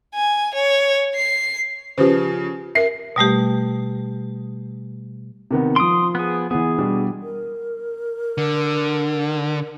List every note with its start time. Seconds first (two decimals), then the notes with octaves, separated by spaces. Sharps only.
0.15 G#5
0.55 C#5
1.16 C7
1.98 C#3 F3 G4 B4 C5
2.75 A#4 E5 C7
3.16 B2 G3 A3 G4
5.51 C3 D#3 B3
5.76 F3 C6 D#6 D7
6.15 B3 G#4
6.51 E3 B3 G#4
6.78 B2 G3 D4
7.22 A#4
8.38 D3